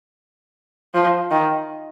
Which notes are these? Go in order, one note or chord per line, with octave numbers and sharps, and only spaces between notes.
F3
D#3